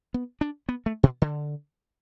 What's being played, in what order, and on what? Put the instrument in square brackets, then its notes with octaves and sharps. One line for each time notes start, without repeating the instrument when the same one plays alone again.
[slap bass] B3
D4
B3
A3
B2
D3